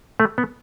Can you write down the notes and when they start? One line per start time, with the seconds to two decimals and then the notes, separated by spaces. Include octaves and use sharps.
0.20 A3
0.38 B3